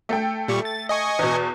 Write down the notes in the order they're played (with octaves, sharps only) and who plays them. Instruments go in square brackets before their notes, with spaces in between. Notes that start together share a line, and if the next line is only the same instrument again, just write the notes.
[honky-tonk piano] A3 A4 G5
[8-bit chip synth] A#2 G3 C#6
A6
D#5 G#5 C#6
[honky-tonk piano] E2 B2